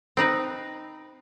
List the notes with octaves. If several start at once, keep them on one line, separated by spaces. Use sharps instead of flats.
C4 D#4 B4